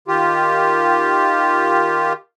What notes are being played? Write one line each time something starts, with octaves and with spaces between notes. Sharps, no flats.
D#3 F4 G4